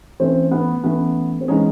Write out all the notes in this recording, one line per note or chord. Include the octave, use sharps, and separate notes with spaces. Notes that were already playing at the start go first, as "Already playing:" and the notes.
E3 A3 C4 C#4
B3
E3 A3 B3 C#4
C4
E3 G#3 B3 C#4 D#4 G#4